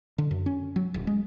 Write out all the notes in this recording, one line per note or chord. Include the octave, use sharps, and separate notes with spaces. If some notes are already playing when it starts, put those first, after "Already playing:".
D3
F#2
C#4
F#3
D#1
G#3